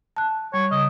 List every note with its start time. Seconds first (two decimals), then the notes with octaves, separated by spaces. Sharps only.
0.17 A5 F#6
0.54 G3 C#5
0.71 C#3 D#5